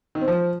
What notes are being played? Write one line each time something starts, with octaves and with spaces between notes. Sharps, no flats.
D#3
C4
F3